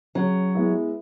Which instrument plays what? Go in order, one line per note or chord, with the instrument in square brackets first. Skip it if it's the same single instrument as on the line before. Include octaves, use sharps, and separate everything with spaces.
[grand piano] C#3 [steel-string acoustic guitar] F#3
[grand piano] G#3 B3 E4